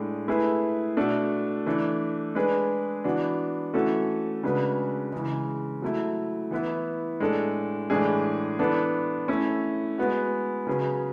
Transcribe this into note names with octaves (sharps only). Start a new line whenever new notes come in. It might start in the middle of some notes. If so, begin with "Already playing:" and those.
Already playing: A2 G#3 D4 G#4
A3 E4 G#4 B4
B2 A3 D4 A4
E3 A3 D4
G#3 D4 G#4 B4
E3 B3 D4 F#4
E3 A3 C#4 F#4 A4
C#3 G#3 D4 F#4 B4
C#3 E3 G#3
F#3 A3 E4
E3 B3 E4 B4
A2 G#3 D4 A4
A2 E3 G#3 D4 G#4
E3 B3 D4 A4
A3 C#4 E4
G#3 B3 F#4
C#3 F#3 C#4 G#4 B4